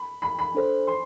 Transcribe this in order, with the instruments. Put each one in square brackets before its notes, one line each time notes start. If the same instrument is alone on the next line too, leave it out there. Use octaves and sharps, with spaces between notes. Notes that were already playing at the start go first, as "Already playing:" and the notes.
Already playing: [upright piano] B5
B5
B5
[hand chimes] D4 A4 C5
[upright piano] C6